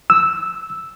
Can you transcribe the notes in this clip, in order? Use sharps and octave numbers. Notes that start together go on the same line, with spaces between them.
E6